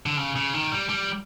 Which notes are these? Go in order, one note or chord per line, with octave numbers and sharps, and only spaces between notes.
D3
C#3
C#3
D#3
G3
G3